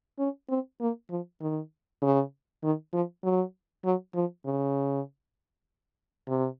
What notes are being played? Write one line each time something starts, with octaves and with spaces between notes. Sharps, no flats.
C#4
C4
A#3
F3
D#3
C#3
D#3
F3
F#3
F#3
F3
C#3
C3